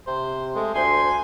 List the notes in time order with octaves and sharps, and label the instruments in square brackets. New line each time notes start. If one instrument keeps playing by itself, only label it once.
[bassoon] C3 [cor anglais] C5
[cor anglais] G#3 [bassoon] A3
[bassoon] D2 [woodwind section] C5 C6 [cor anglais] G#5